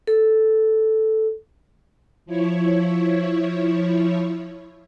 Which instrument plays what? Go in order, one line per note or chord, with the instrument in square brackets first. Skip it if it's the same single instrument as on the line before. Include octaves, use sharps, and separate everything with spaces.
[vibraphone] A4
[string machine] F3 E4 C#5